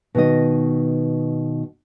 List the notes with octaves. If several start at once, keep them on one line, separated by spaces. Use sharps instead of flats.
B2 D#3 D#5